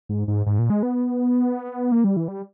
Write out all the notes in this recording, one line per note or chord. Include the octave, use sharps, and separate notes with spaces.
G#2
G#2
G#2
A#2
G#3
B3
A#3
G3
E3
G3